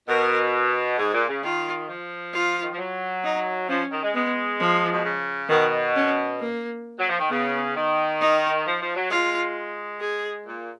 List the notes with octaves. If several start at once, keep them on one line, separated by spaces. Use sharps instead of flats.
B2 A#4
G#2 G#4
A#2
C#3
D#3 F4
F3
F4
D#3
F3
F#3
D#4
F3 C#4
D#3
G#3
G#3 B3
F3
B2
C#3
B2 D#3
C#4
A#3
F#3
F3
D#3
C#3 B3
D#3
D#4
F3
F3
F#3
G#3 F4
G#4
A#2